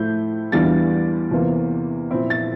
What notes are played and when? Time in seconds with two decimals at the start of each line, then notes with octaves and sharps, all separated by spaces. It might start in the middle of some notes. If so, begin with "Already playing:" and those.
Already playing: A2 F3 A3 E4 G6
0.52 E2 E3 G3 D4 F4 A6
1.31 E2 C3 E3 A#3 F4
2.11 A#2 F3 C4 E4
2.30 A6